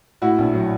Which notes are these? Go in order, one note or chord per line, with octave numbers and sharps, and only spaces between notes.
A2 E4 F#4
A#1
F#3